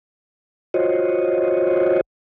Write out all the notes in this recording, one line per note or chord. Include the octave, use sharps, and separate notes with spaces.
F4 F#4 C5 C#5 D#5